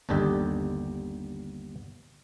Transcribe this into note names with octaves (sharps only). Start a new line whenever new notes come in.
G1 D#2 D4 G4 A4 D#5